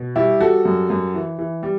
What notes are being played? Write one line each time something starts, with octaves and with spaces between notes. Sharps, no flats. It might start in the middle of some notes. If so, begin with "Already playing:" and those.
Already playing: B2
G3 E4 G4
G3 F#4 A4
F#2
F#2
E3
E3
G3